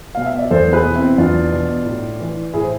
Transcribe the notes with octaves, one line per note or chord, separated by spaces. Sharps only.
B2 F5
E5
D5
E2 A4 C5
G#4 B4
B2
C4 E4
E2 D4 F4
B2
A2
E3
A2 E4 G#4
C5